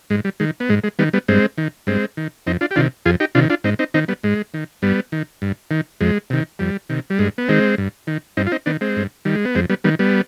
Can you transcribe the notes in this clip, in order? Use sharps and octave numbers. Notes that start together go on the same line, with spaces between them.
G#2 G#3
G3
D#3 G#3
B3
G#2 G#3
G#3
D#3 G3 B3
G3 B3
G2 G#3 C4
D#3
G2 G#3 C4
D#3
F2 C4 D#4
D4 F4
G4
C3 D#3 D4 F4
F2 F4 G#4
D#4 G4
C3 D#3 D4 F4
D4 F4
G#2 C4 D#4
C4 D#4
D#3 C4 D#4
G3 B3
G#2 G#3
D#3
G2 G3 B3
D#3
G2
D#3
F2 G#3
C3 D#3
F2 G3
C3 D#3
G3
G2 G#3
B3
D#3 G#3 C4
G2
D#3
G2 C4 D#4
F4
C4 D#4
D#3 B3 D4
G#3 C4
G2
D#3 G3
G#3
B3
F2 G#3 C4
G3 B3
D#3 G3 B3
G3 B3